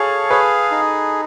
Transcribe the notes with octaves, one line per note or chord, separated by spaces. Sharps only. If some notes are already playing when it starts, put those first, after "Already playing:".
Already playing: G#4 A4 C#5 F5
G#4 B4
D#4